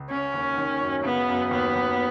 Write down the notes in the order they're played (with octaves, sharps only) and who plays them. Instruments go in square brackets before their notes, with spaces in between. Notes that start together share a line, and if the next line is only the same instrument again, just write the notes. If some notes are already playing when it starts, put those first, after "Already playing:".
Already playing: [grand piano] C#2
[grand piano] C#3 [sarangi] C#4
[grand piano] D#2
D#3
F#2
[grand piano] C#3 [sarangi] B3
[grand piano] F#2
[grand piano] D#2 [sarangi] B3
[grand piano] D#2